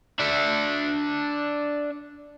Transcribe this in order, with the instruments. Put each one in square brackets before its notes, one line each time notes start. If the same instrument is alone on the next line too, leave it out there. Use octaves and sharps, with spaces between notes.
[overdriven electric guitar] D4 E5